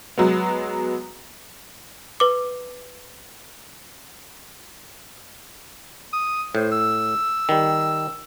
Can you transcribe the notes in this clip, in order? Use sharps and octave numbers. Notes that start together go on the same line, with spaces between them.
F#3 G#3 B3
B4 D6
D#6
A2 C5
E6
D#3 G3